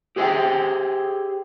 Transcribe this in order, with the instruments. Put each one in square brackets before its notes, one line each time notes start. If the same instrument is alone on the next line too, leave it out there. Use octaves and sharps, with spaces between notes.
[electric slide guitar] G4 G#4 C5 D5 E5 G5